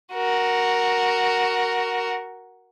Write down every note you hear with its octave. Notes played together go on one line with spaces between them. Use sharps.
F#4 A#4